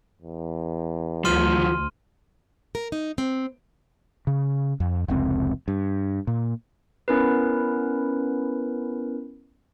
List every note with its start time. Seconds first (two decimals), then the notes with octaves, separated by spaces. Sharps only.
0.22 E2
1.25 D2 F3 F#3 C6 F6 D#7
2.75 A#4
2.92 D#4
3.18 C4
4.27 C#3
4.80 F2
5.08 F1 C#2 C4
5.68 G2
6.27 A#2
7.08 B3 C#4 E4 A#4 B4